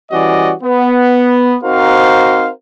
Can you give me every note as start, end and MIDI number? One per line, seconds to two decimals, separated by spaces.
0.11 0.52 52
0.11 0.52 55
0.11 0.52 61
0.11 0.52 66
0.11 0.52 74
0.11 0.52 75
0.61 1.54 59
1.63 2.48 60
1.63 2.48 63
1.63 2.48 66
1.63 2.48 70
1.63 2.48 72
1.63 2.48 77